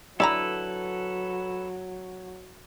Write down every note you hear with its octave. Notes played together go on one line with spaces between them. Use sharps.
D3 F#3 E4 A4 B4 D5 A#5